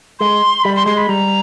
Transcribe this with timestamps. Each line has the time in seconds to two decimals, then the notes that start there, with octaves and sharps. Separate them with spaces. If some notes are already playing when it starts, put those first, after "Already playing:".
0.19 G#3 C6
0.64 G3 B5
0.76 C6
0.86 G#3 C6
0.97 B5
1.09 G3 A#5